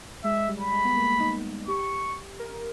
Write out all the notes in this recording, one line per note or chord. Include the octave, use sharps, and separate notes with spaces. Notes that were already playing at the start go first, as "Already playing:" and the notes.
G#3 E5
G3
B5
G#3
B3
A#3
D#4
G4 C#6
A#4